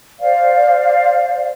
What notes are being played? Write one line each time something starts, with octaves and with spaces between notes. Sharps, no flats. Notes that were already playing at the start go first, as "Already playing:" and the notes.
C5 D5 F5